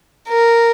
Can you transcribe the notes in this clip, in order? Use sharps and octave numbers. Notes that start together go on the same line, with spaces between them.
A#4